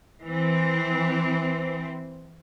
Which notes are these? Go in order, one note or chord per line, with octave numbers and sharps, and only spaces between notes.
E3 C4